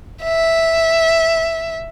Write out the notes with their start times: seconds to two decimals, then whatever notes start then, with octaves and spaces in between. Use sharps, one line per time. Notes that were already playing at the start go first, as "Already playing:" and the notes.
0.23 E5